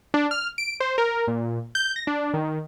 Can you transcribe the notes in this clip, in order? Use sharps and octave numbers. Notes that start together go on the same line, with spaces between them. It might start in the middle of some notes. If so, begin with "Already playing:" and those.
D4
F6
D7
C5
A#4
A#2
G6
A#6
D4
D#3